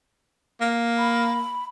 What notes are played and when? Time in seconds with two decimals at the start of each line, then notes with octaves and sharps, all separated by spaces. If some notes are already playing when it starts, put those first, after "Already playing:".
0.61 A#3
0.98 B5